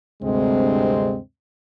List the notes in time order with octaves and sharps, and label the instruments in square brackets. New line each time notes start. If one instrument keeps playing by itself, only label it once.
[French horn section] D2 G2 C3 G#3 C4 D#5